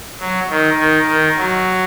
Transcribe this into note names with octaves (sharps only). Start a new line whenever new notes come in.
F#3
D#3
D#3
D#3
F#3